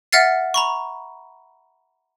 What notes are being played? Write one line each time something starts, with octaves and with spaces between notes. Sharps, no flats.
E5 F#5 F6 A6 C7
A#5 B5 C#6